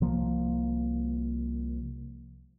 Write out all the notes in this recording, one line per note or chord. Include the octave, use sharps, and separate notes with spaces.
C2 F3 A#3